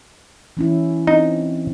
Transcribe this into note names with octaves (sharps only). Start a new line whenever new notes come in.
E3 C#4 E4
C4 D#4